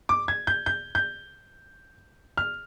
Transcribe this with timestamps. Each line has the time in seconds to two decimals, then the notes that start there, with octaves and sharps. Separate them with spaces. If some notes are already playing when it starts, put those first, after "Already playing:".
0.09 D6
0.28 G#6
0.47 G6
0.66 G6
0.95 G6
2.37 F6